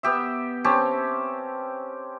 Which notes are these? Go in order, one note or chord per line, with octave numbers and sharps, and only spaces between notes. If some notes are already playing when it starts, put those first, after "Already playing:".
B3 G4 E5
C4 C#4 G4 A5